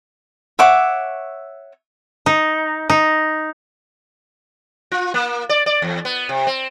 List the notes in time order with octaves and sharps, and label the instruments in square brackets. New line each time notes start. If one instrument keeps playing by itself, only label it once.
[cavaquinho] C#5 E5 F#5 D6
[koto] D#4
D#4
[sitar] F4
A#3
D5
D5
E2
B3
C3
C4